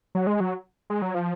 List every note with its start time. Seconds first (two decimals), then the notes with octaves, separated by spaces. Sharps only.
0.15 F#3
0.27 G#3
0.40 F#3
0.90 G#3
1.02 F#3
1.15 F3